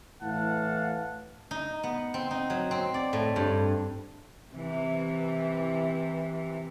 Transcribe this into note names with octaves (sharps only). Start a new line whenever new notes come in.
A2 E3 F5 F#5 A5
D#4
B3
C4
D#4
F#3
C4
D5
A2
G2
C3 E3